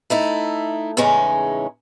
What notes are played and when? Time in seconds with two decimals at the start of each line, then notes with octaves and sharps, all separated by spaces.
0.10 A3 D#4 E4
0.97 E2 A2 C#3 G#3 C#4 D#4